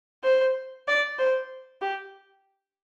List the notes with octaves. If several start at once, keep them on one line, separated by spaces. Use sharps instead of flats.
C5
D5
C5
G4